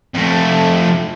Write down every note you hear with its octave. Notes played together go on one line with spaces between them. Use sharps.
F2 A3